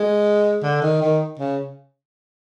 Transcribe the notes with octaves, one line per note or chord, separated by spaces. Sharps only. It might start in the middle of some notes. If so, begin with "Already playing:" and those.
Already playing: G#3
D3
D#3
D#3
C#3